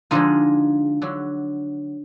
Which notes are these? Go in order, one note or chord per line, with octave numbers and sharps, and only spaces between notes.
D3 F3 G#3 D#4 F4
D3 F#3